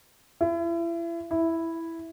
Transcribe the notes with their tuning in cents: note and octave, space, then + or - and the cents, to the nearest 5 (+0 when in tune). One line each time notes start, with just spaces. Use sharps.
E4 +35
E4 +0